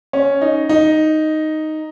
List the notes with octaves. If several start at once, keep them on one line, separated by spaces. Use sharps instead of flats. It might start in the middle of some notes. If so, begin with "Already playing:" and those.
C#4
D#4
D#4